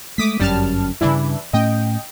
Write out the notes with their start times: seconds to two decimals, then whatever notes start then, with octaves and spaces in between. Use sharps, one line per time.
0.18 G#3 A3 D6 D#6 B6
0.40 G1 F#2 G3 C#4 A5 F6
1.01 G2 C#3 E3 D4 E4
1.53 A2 A3 C#4 D#5 G5